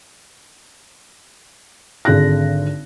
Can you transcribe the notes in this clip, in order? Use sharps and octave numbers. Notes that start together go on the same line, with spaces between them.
G#1 D3 G#4 F#6 A#6